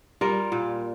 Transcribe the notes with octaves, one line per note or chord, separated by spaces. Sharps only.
G3 F4 A#4
A#2